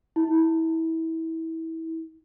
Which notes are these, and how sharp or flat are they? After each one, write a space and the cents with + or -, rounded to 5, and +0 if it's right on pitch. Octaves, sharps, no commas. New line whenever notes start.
E4 -25